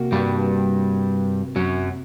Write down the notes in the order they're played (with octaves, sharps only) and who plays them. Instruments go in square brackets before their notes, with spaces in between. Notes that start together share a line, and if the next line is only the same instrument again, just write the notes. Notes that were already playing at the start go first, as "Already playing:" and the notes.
Already playing: [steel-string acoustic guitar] C3 A#3 F#4
[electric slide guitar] G2 G3
F#2 F#3